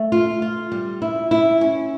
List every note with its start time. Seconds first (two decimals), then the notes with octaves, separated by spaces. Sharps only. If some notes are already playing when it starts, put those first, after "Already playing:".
Already playing: A3
0.12 F4
0.42 F4
0.72 G3
1.02 E4
1.31 E4
1.61 C#4